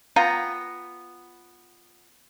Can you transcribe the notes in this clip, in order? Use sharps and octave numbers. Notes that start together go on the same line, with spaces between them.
B3 F4 G5 A#5